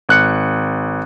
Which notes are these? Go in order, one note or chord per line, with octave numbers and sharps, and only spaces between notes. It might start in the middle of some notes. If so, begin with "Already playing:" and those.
G#1 F#6 C#7